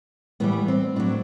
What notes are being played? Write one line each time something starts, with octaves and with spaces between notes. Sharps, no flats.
A2 E3 G3 B3
C4
A2 F#3 D4